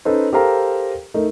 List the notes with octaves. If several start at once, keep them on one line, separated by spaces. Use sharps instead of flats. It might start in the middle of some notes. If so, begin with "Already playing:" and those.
C#4 D#4 A4 B4 C5
G4 A4 A#4 C5 F5 A#5
A3 D#4 A#4